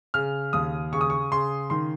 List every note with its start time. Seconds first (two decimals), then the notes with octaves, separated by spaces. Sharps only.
0.14 C#3 F6
0.53 D#2 D#6
0.92 C#3 C#6
1.01 D#6
1.10 C#6
1.31 C#3 C6
1.70 D#3 C6